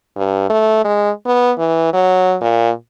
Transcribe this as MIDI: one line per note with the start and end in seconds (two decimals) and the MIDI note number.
0.17 0.47 43
0.50 0.84 57
0.84 1.10 56
1.26 1.51 59
1.58 1.88 52
1.93 2.35 54
2.41 2.70 46